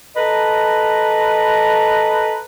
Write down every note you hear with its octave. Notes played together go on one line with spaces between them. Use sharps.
A4 B4 D#5 A#5